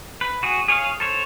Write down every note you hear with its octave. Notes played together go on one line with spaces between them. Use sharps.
B4
F#4 G#4
G#4 C#5 D5 F5
A4 C5 C#5